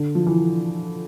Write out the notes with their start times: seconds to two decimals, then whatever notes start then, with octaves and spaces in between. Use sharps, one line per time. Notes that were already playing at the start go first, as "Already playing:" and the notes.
Already playing: D3
0.15 F3
0.26 E3